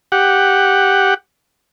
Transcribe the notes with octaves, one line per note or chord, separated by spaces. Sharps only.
G4 F#5